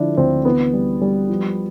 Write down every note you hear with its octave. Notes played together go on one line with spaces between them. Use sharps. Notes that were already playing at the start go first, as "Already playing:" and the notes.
Already playing: D3 F3 D4 E4
D2 C4
E3 B3
G3
G3
F3